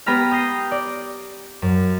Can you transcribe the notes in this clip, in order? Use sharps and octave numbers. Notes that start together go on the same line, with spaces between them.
G#3 B3 G4 A#5 B5 F6
D#6 G6 A#6 C7
D5
F#2